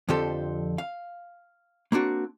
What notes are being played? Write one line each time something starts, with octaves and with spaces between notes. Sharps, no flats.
F2 D3 F3 G4 A4 C5
F5
A#3 C4 D4 F#4